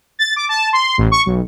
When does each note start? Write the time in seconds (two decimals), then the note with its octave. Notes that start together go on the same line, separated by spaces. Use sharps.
0.19 A6
0.36 D6
0.49 A5
0.73 C6
0.98 A1
1.12 C#6
1.26 B1